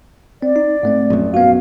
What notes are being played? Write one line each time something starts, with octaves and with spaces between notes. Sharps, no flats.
C4 D5
D#4
G#2 A3 C4
A#1 F#2
B3 F#4 F5